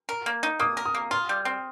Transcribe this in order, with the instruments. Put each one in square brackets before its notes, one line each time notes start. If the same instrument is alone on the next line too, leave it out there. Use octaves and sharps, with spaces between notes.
[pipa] A#4
A#3
D#4
[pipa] A#3 [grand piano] D#6
[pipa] A#4
[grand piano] D#6
[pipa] A#3
[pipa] F4 [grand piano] F6
[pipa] G3
C4